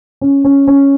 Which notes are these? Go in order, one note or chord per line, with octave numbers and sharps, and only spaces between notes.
C#4
C#4
C#4